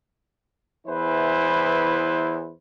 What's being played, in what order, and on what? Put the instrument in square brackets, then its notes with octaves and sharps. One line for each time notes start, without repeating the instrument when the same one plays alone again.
[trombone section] E2 E3 E4 B4 C5